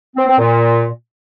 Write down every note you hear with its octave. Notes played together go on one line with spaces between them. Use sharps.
C4
C4
A#2